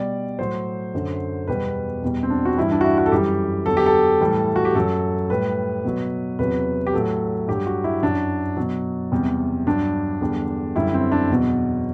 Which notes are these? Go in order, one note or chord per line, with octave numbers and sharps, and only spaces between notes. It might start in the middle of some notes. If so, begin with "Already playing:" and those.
Already playing: B2 G3 D5
A2 F#3 C5
F#2 D3 F#3
E2 B2 G3 B4
E2 B2 G3
C4
D4
F#4
G2 E3 G3 E4
D4
F#4
E4
F#4
A4
F#2 E3 G3 G4
E2 D3 F#3 A4
G4
A4
A2 E3 G3
F#4
G4
F#2 F#3 A4
A2 G3 B4
B2 F#3
E2 C3 F#3 B4
G4
A2 F#3 A4
G2 F#3 G4
F#4
E4
F#2 F#3 D4
B2 F#3
E2 C3 G3
G2 F#3 D4
E2 D3 G3
F#2 D3 G3 E4
C4
D4
E2 B2 F#3